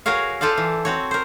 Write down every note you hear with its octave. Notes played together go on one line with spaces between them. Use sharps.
F#4 G#4 A#4 C#5 F5
F4 A4 C5 D5 F5
E3
C4 F#4 C#5
A#4 C5